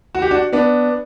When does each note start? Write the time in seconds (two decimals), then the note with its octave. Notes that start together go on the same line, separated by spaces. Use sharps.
0.15 F#4
0.22 G4
0.31 D4 F#4
0.53 B3 D4